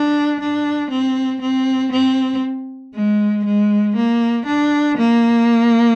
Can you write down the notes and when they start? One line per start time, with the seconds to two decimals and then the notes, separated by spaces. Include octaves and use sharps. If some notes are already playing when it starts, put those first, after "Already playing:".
Already playing: D4
0.40 D4
0.90 C4
1.41 C4
1.92 C4
2.94 G#3
3.45 G#3
3.96 A#3
4.46 D4
4.98 A#3